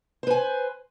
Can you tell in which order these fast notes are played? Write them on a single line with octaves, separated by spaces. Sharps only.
C5 B4 G#5